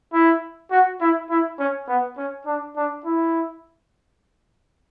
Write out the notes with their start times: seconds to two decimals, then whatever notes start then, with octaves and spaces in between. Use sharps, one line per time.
0.13 E4
0.71 F#4
1.01 E4
1.30 E4
1.59 C#4
1.88 B3
2.17 C#4
2.46 D4
2.76 D4
3.05 E4